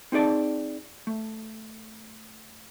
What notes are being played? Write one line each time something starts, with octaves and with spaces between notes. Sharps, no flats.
C4 D#4 G#4 D5 A5
A3